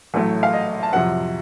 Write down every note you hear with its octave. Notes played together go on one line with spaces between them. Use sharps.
A1 A2 F#3 A3
F5
D#5
A5
F2 C3 F#3 F#5